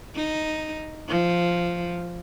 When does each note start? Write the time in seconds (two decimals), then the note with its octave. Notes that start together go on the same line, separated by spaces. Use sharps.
0.15 D#4
1.08 F3